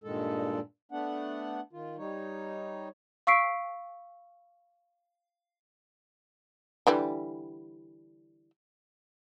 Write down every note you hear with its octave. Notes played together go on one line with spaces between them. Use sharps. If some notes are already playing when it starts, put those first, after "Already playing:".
G2 A#2 D#3 G#3 A4
A3 B3 D4 F#5
D#3 F4
G3 D#4 C#5
F5 C#6 E6 B6 C7 D7
D3 E3 G3